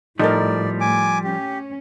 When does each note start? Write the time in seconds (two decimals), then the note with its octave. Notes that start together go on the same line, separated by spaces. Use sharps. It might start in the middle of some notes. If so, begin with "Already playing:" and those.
0.19 A2 F3 G3 D#4 A4 A#4 D5
0.81 G#5 D6
1.24 C#4 G4